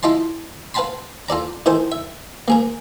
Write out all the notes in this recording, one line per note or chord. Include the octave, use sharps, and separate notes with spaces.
E4 F4 D#5 A5 C6
B4 F5 F#5 A5 B5 C6
F4 A4 D5 A#5
D#3 E3 A4 C5
E5
A#3 G#4 A#4